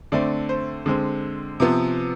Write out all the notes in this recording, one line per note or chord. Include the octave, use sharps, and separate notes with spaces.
D3 A3 C4 D5
C5
D3 G#3 C4
C3 F3 B3